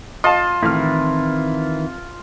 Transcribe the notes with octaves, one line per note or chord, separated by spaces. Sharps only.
F4 D#5 A5
A2 D#3 E3 C4 E4 F6